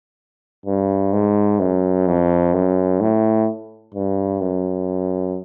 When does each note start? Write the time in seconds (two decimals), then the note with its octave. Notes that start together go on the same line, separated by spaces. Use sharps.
0.66 G2
1.13 G#2
1.60 F#2
2.07 F2
2.54 F#2
3.01 A2
3.94 G2
4.41 F#2